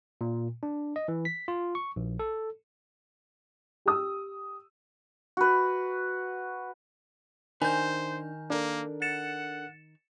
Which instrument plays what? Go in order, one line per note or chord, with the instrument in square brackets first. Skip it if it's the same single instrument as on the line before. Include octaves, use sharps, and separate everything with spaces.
[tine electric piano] A#2
D4
D#5
E3
B6
F4
C#6
A#1
A4
[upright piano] G4 D#6 E6
[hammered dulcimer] F#4 B4
[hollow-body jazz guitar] D#3 [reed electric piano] D4 [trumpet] C5 [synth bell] G#5 G6
[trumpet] A#3 [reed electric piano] D4 A4 A#4
[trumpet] F#5 [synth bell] A6 C#7 E7